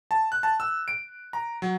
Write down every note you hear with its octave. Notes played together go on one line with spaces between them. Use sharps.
A5
F#6
A5
E6
D7
A#5
F#3